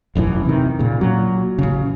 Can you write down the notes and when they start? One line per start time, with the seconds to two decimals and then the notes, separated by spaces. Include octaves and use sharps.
0.15 E1 A1 F#2 E3
0.45 C3 D#3
0.79 A#2 C#3
1.01 A#2 F#3
1.59 A1 C#3